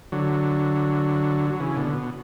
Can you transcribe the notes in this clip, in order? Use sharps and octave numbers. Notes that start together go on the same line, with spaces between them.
D3 F#3
F#3
C#3 E3
B2 D3
B2